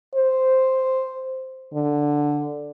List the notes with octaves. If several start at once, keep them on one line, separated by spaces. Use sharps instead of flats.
C5
D3